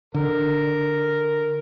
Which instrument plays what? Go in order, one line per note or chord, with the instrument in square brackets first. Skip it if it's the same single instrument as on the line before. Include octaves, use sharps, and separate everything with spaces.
[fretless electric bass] D3 [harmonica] A#4